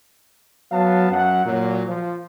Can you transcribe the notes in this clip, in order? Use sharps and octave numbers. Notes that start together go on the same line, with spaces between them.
F#3 B3 F5 A5
F#2 F#5
A#2 F#3
F3